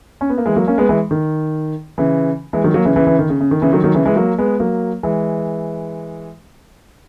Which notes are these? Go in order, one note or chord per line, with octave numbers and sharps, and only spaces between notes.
C#4
B3
A#3
E3 G#3
F#3 A#3
A#3 C#4
G#3 B3
E3 G#3
D#3
C#3 E3
E3 G#3
D#3 F#3
F#3 A#3
C#3 E3
C#3 E3
C#3 E3
D#3
C#3
C#3
D#3
C#3 E3
D#3 F#3
D#3 F#3
C#3 E3
E3 G#3
F#3 A#3
G#3 B3
F#3 A#3
E3 G#3